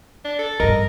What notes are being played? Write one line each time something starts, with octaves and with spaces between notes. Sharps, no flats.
D4
A4
A1 G2 A#4 D#5